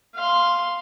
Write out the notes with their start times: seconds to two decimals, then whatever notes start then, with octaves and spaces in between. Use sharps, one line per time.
0.15 F5 C6